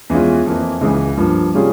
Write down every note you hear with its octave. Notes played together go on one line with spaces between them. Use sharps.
E2 E3 G#3 C#4 F4
F2 E3 A#3
C#2 C#3 E3
G2 F3 A#3
C3 G3 C#4 F4 G#4